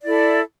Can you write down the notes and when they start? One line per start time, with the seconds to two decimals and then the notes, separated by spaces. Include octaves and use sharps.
0.02 D5
0.05 E4
0.08 A4